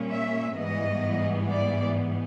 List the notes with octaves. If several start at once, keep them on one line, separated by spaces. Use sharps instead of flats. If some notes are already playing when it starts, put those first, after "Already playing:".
Already playing: A#2 G3 A#3 C#4
E5
G#2 E3 G3 B3 D#5
D5